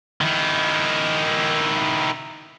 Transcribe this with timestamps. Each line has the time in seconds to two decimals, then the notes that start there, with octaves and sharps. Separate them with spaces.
0.21 D#3 E4